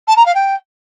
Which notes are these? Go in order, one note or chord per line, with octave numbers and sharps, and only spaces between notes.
A5
A#5
F5
G5